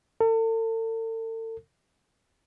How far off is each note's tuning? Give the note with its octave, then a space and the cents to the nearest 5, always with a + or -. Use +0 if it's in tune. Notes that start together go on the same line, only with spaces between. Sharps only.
A4 +40